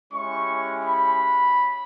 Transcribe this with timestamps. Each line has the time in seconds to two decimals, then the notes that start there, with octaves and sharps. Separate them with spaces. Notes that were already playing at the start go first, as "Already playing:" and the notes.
0.11 G#3 C#4 E4 G4 C#6
0.84 B5